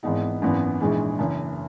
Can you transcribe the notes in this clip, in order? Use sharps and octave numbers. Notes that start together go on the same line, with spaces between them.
G#1 G#2 E3 B3 D#4
G#1 F#2 E3 B3
A#1 G#2 E3 G#3
F#1 F#2 E3